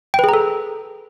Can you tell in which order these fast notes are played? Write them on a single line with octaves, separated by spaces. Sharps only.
G5 B4 G#4 A#5 A4